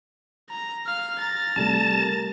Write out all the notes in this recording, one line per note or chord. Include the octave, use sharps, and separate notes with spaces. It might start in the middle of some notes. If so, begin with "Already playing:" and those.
A#5
F5 F6
A#5 A6
C3 G3 A3 A5
A#4